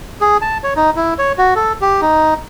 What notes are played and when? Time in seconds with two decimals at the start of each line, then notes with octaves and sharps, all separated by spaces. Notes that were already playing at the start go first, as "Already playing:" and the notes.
0.21 G#4
0.42 A5
0.64 C#5
0.76 D#4
0.96 E4
1.19 C#5
1.38 F#4
1.56 A4
1.81 G4
2.02 D#4